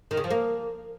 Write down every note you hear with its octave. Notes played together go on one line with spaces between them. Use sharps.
D#3
C#3
F3
A#3